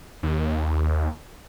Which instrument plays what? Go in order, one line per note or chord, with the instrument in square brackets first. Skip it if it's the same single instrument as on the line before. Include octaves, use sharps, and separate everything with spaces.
[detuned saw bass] D#2